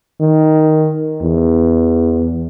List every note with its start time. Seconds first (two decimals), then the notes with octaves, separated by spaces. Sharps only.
0.20 D#3
1.22 E2